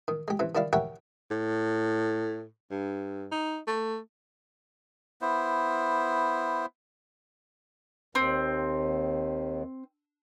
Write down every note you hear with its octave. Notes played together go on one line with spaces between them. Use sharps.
D#3
G#3 G4
C3 E3
D#3 G3 E4 D5 F5
G4 A#4 C#5 E5 F#5 G5
A2
G2
D#4
A3
B3 E4 C5
D#2 C4